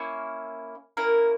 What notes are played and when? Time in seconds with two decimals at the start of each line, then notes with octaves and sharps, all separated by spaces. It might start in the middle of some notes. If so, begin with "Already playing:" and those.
Already playing: A#3 C#4 E4
0.97 A#3 C#4 E4 A#4